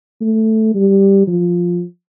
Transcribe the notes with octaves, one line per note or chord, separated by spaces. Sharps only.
A3
G3
F3